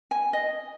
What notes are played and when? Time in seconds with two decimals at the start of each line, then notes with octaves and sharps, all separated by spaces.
0.11 G#5
0.33 D#5